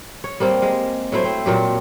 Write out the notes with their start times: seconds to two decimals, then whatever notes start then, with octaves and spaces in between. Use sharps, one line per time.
0.24 C#5
0.40 G3 A#3 C4
0.62 G#3
1.12 F#3 A3 E4 C5
1.24 C4
1.46 A#2 F#3 G4